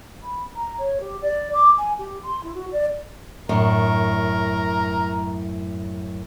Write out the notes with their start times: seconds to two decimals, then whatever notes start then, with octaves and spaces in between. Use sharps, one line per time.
0.23 B5
0.56 A#5
0.79 C#5
1.01 G4
1.22 D5
1.53 D6
1.78 G#5
1.98 G4
2.23 C6
2.44 E4
2.55 F#4
2.72 D5
3.49 F#2 A2 D4 A#4